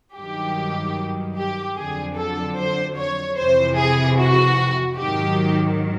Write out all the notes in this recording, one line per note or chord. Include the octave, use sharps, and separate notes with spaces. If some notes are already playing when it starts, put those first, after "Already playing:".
G2 D#3 F#3 G4
G4
F2 D3 F#3 G#4
A4
C5
C#5
F2 C3 E3 C5
G#4
F#4
G#2 D#3 F#3 G4